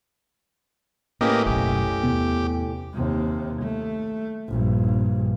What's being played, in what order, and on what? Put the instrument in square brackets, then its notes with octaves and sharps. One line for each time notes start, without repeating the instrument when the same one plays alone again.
[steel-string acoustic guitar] A2 C#4 B4 [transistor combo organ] A#3 G4 D#5
[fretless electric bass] F#1 B1 [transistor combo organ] G4
[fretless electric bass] E2 C3 B3
[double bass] D#2 C3
A3
A#1 G2